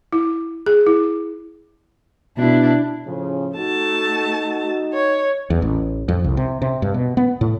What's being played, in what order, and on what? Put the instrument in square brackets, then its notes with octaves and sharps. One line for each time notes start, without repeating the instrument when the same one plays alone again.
[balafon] E4
G#4
E4
[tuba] B2 [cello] D4 E4
[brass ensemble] A2 C#3 F3
[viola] A3 A5 [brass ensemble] D#4 F#4
[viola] C#5
[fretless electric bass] E2
A1
F2
C2
C3
C3
G2
B2
B3
A2